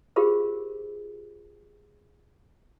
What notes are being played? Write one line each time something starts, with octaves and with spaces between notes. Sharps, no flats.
F4 G4 G#4 A#4 C5